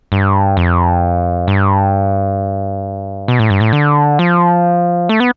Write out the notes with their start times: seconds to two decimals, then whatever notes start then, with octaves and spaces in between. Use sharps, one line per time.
0.12 G2
0.57 F2
1.48 G2
3.28 B2
3.39 A2
3.50 G2
3.61 A2
3.73 D3
4.19 F3
5.09 A3
5.20 B3